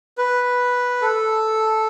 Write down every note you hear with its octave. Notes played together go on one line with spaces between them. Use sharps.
B4
A4